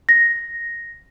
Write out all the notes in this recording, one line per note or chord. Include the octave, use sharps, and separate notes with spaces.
A#6